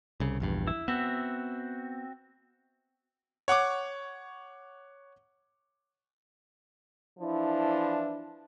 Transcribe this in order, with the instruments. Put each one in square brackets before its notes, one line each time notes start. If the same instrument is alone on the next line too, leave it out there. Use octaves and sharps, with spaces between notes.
[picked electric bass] C2 C#3
A#1 E2 G2
[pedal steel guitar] E4
[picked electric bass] B3 [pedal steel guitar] C4 F#4 E5
[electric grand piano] C#5 F#5 C#6 D6
[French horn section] E3 F3 D4 E4